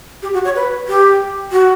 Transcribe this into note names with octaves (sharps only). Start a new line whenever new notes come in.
G4
F#4
C#5
B4
G4
F#4